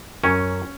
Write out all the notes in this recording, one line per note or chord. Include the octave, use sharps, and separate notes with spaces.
F#2 C#4